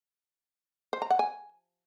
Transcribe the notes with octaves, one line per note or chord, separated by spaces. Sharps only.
C5
A#5
F#5
G#5